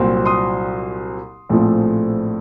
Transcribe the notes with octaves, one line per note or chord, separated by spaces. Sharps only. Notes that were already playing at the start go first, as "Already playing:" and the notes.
Already playing: C2 A#2 F#3 C4
C6 D#6
A#1 A2 F3 A3 C4